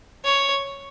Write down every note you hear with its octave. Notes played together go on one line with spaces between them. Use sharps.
C#5